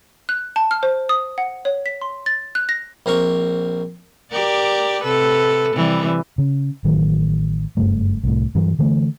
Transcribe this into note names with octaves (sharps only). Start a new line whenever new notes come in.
F#6
A5
F6
C5
D#6
F#5
C#5
B6
C6
A6
F#6
A#6
A#1 C4 A#4 C#6
G4 A#4 D5
C3 A4 B4
C3 E3 G3
C#3
A1 D#3 F#3
F#1 G2 A3
C2 A2
G2 E3 F#3
D3 E3 A3